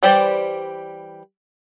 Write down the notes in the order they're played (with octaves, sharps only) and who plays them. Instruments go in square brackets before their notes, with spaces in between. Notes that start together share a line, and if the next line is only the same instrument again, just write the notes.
[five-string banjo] E3 G3 G4 C5 D5